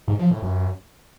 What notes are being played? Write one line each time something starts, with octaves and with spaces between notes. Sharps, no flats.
G#2
F3
A2
F#2